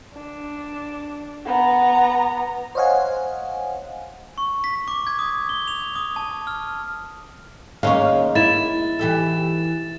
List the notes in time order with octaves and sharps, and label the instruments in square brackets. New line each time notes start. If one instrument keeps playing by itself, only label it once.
[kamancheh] D4
B3 A#5
[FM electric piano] C5 C#5 D#5 F5 F#5 G#5
[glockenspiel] C#6
B6
D6
G#6
D#6
G7
F7
D#6
A5
F6
[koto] D#3 G#3 [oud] A#3 C#4 [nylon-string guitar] F5
[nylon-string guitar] E4 [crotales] A6 E7
[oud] E3 G4 A4